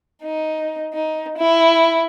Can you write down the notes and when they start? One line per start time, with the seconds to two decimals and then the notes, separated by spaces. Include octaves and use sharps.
0.23 D#4
0.93 D#4
1.38 E4